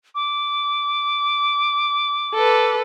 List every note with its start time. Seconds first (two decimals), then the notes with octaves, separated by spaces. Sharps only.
0.14 D6
2.34 A4 B4